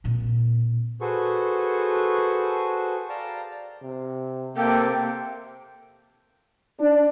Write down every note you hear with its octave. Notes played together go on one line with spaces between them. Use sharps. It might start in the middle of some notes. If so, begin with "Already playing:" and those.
A#2 C4
F#4 G#4 A4 B4 C5 C#6
D5 F5 G5 A5 A#5
C3
C3 A#3 A4 G5
D4